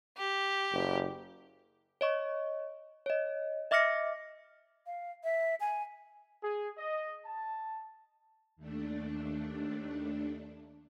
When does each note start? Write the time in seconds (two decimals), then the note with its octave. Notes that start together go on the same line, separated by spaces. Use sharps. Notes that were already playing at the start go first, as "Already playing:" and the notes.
0.17 G4
0.73 F#1
2.01 C#5 D#5 C#6
3.06 C#5 D#5
3.71 D#5 E5 D6 F6 A#6 C#7
4.86 F5
5.24 E5
5.60 G#5
6.43 G#4
6.77 D#5
7.25 A5
8.56 D#2 A3 D4